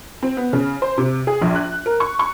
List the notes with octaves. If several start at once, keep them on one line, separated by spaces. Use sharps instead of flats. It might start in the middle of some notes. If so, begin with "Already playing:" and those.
C4
B3
C#3
C5
C3
G#4
A#1
F#6
A#4
C#6
C#6